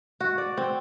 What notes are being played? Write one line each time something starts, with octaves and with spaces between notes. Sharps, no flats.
F#4
D5
C4